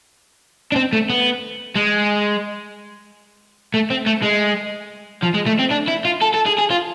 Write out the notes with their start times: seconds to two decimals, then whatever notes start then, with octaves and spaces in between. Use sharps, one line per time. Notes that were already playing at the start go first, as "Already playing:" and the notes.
0.72 D4
0.76 C4
0.93 A3
1.10 B3
1.75 G#3
3.74 A3
3.90 C4
4.07 A3
4.23 G#3
5.22 F3
5.34 G#3
5.46 A3
5.59 C4
5.71 D4
5.88 E4
6.05 F4
6.21 A4
6.34 A4
6.46 G#4
6.58 G#4
6.70 F4